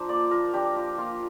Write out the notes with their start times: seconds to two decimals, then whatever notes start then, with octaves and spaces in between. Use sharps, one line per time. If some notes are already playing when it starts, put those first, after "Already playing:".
Already playing: F3 D4 C5 A#5
0.09 A#3 D5
0.31 F3 A#4
0.54 D4 G4
0.76 F4
0.98 A#3 F4